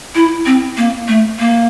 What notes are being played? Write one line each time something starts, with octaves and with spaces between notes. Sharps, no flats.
E4
C4
A#3
A3
A#3